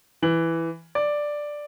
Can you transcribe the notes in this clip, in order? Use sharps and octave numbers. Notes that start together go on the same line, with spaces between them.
E3 F#7
D5